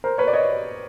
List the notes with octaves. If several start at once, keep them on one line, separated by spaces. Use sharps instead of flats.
A#4 C5
B4 C#5
D5
C#5 D#5